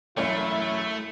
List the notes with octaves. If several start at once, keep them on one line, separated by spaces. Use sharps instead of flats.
E1 F#2 A3 C#4 E4 C#5 D5 F5